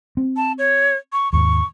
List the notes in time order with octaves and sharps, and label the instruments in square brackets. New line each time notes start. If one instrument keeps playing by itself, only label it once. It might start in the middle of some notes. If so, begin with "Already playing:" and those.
[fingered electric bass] C4
[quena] A5
C#5
C#6
[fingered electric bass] D#2 G#2 [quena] C#6